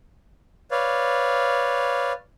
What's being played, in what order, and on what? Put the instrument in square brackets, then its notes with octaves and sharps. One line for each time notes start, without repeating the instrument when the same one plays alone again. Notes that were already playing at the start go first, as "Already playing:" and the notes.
[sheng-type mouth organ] B4 C#5 D5 F5